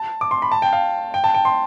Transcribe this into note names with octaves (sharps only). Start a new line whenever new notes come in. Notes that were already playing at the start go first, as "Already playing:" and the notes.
Already playing: A5
D6
C6
B5
A5
G5
F5
G5
A5
G5
C6